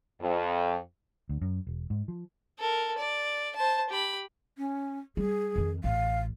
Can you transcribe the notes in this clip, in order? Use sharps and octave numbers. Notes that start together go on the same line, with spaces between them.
F2
D2
F#2
E1
G#2
F3
A4 A#4
D5
C5 A5
G4 B5
C#4
G3 G#4
F2 D#3
A1 F5